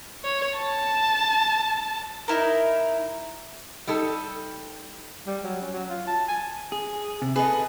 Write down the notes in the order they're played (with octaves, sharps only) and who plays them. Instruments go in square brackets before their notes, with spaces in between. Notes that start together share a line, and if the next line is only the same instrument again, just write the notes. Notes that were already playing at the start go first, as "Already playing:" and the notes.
[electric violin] C#5
A5
[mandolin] D#4 E4 A#4
[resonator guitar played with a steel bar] G3 D#4 A4
[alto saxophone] G3
F#3
C#4
F#3
F4
A5
G#5
[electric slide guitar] G#4
C3
[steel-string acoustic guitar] G#4 D#5 [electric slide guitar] A4 B4